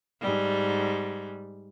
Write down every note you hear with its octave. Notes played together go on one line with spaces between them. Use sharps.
G#2 G3